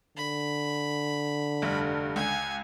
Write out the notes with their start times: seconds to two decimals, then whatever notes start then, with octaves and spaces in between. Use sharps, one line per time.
0.17 D3 B5
1.62 F1 G2
2.16 C#2 G#5